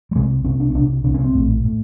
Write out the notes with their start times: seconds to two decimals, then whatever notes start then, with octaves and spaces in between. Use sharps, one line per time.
0.11 G3
0.16 C2 C3 G#3
0.44 C2 C3 C#4
0.60 D4
0.70 C#4
0.75 C2 D4
0.79 C3
1.04 C3 D4
1.07 C2
1.14 C#4
1.24 C4
1.34 A#1 A2
1.64 A2